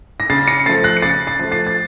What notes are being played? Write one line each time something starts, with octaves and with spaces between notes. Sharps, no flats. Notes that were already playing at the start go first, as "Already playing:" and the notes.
A#6
C#3 A6 C7
A#6 C#7
F3 A3 A6 C7
F#6 A#6
C#7
C#3 A6 C7
A6 C7
F3 A3
A6 C7
A6